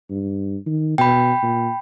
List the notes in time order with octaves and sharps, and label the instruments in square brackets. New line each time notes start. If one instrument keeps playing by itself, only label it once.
[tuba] G2
D#3
[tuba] B2 [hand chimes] G5 B5
[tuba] A#2